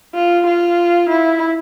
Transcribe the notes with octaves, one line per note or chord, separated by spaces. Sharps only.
F4
F4
E4